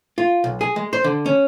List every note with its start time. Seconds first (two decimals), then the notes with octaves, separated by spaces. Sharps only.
0.18 F4
0.44 B1
0.61 G#4
0.76 G#3
0.93 C5
1.04 D3
1.26 C#4